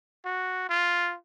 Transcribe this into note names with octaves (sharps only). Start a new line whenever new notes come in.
F#4
F4